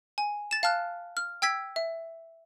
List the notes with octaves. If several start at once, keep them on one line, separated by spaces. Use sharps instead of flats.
G#5
A6 E7
F5 A5 F6 F#6
F6
G5 E6 G#6 B6
E5